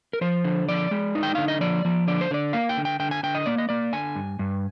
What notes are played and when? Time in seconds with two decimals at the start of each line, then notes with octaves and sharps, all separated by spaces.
0.13 A#4
0.21 F3 C5
0.44 D3
0.69 F3 D5
0.91 G#3
1.15 D#4
1.23 G5
1.35 D3 F5
1.48 D#5
1.61 F3 D5
1.85 F3
2.07 D3 D5
2.21 C5
2.31 D3 D5
2.53 A#3 F5
2.69 G5
2.77 D3
2.85 G5
3.00 D3 G5
3.11 G#5
3.23 D3 G5
3.35 D#5
3.46 A#3 D5
3.58 D#5
3.69 A#3 D5
3.93 D3 G#5
4.15 G2
4.39 G2